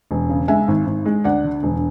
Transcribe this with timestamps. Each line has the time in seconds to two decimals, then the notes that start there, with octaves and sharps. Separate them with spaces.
0.11 E1
0.29 C#3
0.48 G#3 E5 G#5
0.68 G#1
0.86 G#1
1.05 G#3
1.24 D2 D5 F#5
1.44 D3
1.63 E1